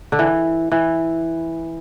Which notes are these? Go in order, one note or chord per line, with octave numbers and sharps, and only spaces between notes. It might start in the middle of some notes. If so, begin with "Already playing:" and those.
D3
E3
E3